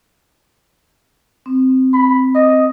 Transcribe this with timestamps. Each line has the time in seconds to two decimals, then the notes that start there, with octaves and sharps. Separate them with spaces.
1.46 C4
1.93 B5
2.35 D#5